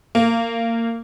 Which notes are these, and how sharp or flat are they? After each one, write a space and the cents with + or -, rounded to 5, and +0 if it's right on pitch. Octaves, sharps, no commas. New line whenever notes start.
A#3 -20